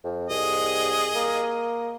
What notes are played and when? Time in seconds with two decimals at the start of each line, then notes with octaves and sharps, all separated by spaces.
0.04 F2
0.30 C2 G#4 D#5
1.15 A#3